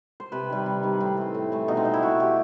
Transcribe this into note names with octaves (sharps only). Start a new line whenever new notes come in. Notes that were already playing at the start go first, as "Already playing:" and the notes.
C5
C3 B4
D#3 G3
C3
D#3 G3
A2 C4
E3 A3
A2
E3 A3
B2 D#4
C4
A3 D#4
E4
B2 F#4
A3 G4